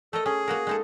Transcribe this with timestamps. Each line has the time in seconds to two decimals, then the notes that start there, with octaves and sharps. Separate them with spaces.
0.13 A3 A4 A#4 D#5
0.26 C#4 G#4
0.48 A#3 F#4 A#4
0.67 G#3 D#4 A4